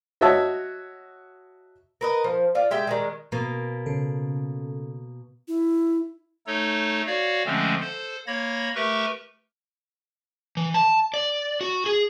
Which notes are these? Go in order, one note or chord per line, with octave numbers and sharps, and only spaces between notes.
F#4 C#5 D#5 E5 A5
A#4 B4 D#5
F3
F4 D5
G#3 G4 E5 G5
D#3 G3 G#3
B2 A#3
C#3 A4
E4
A3 D#4 A4 C#5
F#4 C#5 D5 F5
D3 F3 G#3 A3 C4 C#4
A4 C5
A#3 C#5 B5 G#6 A#6
A3 G4 A#4 B4 E5 C#6
E3
A5
D5
F#4
G#4